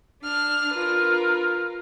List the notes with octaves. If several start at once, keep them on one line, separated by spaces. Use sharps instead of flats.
D4 F6
F4 A#4 B4 F6